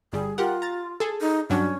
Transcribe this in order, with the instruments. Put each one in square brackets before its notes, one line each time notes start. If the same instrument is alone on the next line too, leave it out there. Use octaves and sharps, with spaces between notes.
[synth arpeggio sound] G1 G3 [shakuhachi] G#4
[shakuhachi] F4 [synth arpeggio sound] G4 A#4 F#5
[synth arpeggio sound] A#5 A6
G#4 A4
[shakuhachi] D#4
[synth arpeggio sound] G2 F#3 D4 [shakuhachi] C#4